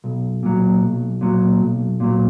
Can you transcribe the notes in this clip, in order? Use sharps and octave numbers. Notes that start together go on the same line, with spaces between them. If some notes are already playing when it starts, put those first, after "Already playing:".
B1
A#2 F#3
B1
A#2 F#3
B1
A#2 F#3